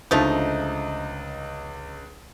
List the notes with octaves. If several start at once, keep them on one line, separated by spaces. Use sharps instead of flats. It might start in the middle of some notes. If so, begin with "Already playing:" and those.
C#2 D3 F3 A3 D#4